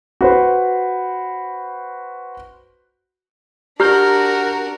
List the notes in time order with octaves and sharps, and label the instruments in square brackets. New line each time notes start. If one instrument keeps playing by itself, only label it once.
[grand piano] F#4 B4 C5
[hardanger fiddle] D4 F#4 [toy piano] G4 [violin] A#4 [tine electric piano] A#5 F6 G6